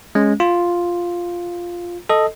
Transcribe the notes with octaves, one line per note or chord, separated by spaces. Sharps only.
G#3 C#4
F4
A4 D#5